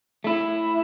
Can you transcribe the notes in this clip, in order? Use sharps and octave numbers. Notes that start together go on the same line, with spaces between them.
A3 E4